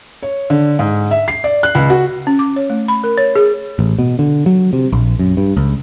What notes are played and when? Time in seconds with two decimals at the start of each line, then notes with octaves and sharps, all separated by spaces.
0.23 C#5
0.50 D3
0.79 G#2
1.11 E5
1.28 C7
1.44 D5
1.63 F#6
1.75 C#2
1.90 F#4
2.27 C#4
2.39 D6
2.56 C#5
2.70 A3
2.88 B5
3.04 A#4
3.18 C#5
3.36 G#4
3.79 A1
3.99 B2
4.19 D3
4.46 F#3
4.73 C3
4.92 A#1
5.19 F#2
5.37 G2
5.57 C#2